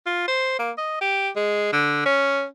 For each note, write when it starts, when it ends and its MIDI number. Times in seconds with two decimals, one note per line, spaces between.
0.06 0.25 65
0.27 0.55 72
0.59 0.71 58
0.78 0.97 75
1.01 1.29 67
1.36 1.71 56
1.72 2.06 50
2.06 2.44 61